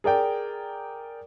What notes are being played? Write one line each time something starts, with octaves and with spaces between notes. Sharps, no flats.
G#4 A#4 D5 G5